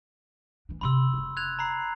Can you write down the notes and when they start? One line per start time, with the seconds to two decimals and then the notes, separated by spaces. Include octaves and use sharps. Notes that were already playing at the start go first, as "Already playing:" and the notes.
0.69 E3 D4
0.81 C3 D#3 B5 C6 E6
1.13 F1 C#3
1.37 F#6 G#6 F7
1.59 A#5 B5 C7